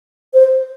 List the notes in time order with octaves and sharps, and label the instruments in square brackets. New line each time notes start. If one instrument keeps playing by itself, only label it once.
[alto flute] C5